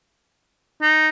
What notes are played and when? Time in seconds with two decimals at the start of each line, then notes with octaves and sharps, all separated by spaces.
0.82 D#4